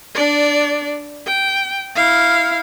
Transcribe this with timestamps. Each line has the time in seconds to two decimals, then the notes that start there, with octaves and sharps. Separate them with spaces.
0.15 D4 D5
1.27 G5
1.96 E4 F5